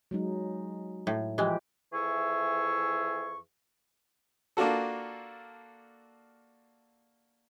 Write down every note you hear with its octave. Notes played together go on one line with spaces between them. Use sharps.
F#3 G#3 D#4
A2
E3 F3 G#3 G4
F2 E3 G#4 E5 C#6
A#3 D4 F4 F#4 A4